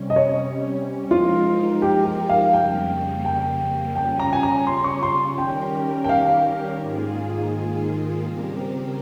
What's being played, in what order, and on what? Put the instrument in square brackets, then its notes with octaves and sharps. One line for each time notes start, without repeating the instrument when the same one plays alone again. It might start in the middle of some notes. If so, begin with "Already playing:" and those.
Already playing: [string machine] C3 G3 C#4
[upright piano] D#5
C#5
[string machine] F3 G#3 D#4 A#4 [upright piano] F4
[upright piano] G4
G4
F5
[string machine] F2 C#3 G3 A#3 [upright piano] G5
[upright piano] G5
[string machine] C#3 G3 C#4 F4 [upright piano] G5
[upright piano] A#5
G#5
A#5
C6
C#6
C6
[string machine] D#3 G3 C#4 G4 A#4 [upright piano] G5
[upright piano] G5
F5
[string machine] G#2 D#3 A#3 F4 G#4
C#3 G3 C4 G4 A#4